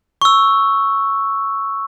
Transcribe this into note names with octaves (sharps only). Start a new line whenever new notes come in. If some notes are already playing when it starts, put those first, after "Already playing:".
C#6 E6